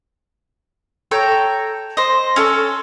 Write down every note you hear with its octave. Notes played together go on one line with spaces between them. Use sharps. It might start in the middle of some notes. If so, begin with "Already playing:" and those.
A4 C#5 G5 A#5
C5 D#5
C#4 A4 C#6